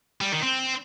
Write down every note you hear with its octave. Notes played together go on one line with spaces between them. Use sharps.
G3
D#3
C4